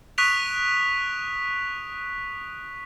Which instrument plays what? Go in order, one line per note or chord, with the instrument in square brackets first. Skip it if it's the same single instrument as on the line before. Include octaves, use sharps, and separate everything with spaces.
[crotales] C#6 D#6 F#6 B6 D7 F7